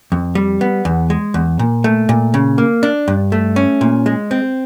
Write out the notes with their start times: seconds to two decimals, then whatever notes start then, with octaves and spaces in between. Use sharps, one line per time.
0.12 F2
0.35 G3
0.61 B3
0.85 E2
1.10 G#3
1.34 E2
1.59 A#2
1.84 A3
2.09 A#2
2.34 C#3
2.58 A#3
2.83 D4
3.08 G2
3.32 A3
3.56 C#4
3.81 A#2
4.06 G#3
4.31 C4